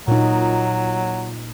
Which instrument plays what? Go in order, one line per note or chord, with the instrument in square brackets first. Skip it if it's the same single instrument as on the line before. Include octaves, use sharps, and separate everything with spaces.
[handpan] A#2 D#4 [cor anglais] F#3